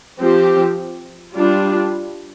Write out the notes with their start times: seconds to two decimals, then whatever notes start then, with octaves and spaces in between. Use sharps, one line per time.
0.18 F3 C4 G4
1.36 G3 D4 F4